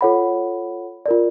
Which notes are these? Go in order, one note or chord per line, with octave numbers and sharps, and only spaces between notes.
F4 A4 C#5 F#5 B5
F4 A#4 D5